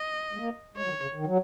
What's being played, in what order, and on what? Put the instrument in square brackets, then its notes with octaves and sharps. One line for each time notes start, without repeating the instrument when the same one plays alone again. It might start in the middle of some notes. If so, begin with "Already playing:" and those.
Already playing: [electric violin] D#5
[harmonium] G#3
A#3
[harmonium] G#3 [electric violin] C#5
[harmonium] F#3
D#3
C#3
D#3
F#3